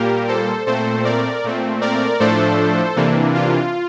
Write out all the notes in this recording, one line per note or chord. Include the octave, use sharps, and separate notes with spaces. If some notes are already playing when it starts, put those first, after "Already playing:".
Already playing: A#2 G3 A#3 G4 A#4
A4 C5
A#2 A3 C4 A4 C5
A#4 D5
A#2 A3 C4
A#4 D5
A2 F3 A3 D4 A4 C5
C3 E3 A#3 D4
F4